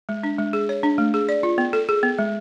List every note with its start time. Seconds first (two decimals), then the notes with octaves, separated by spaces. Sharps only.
0.09 G#3
0.23 D4
0.38 G#3
0.53 G#4
0.69 C#5
0.83 D4
0.98 A3
1.14 G#4
1.29 D5
1.43 F4
1.58 B3
1.73 A4
1.89 G#4
2.03 B3
2.19 G#3